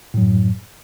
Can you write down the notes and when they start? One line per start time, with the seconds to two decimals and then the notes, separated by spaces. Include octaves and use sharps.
0.14 A2
0.17 F#3
0.21 F#2